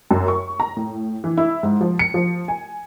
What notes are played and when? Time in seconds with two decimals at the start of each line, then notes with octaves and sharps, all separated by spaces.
0.11 F#2
0.28 C#6
0.60 A#5
0.77 A2
1.24 E3
1.37 E4
1.63 G#2
1.81 F3
1.99 C#7
2.14 F3
2.48 G#5